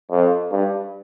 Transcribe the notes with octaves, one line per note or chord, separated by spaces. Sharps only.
F2
G2